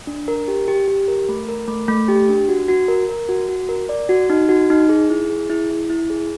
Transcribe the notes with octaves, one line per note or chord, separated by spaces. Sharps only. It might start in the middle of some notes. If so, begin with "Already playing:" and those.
D4
A#4
G4
G4
G4
A#4
A3
A#4
A3
A3
G4
D4
F#4
F#4
A#4
A#4
F#4
F#4
A#4
D5
F#4
D#4
F#4
D#4
G#4
E4
G#4
E4
E4
E4
G#4